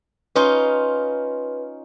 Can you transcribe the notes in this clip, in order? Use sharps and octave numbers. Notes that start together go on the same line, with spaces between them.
C#4 D#4 F4 B4